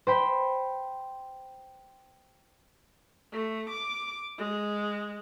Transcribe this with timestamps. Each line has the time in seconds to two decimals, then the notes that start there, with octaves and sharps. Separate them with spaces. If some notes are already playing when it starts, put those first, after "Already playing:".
0.07 C5 G5 B5
3.32 A3
3.70 D6
4.38 G#3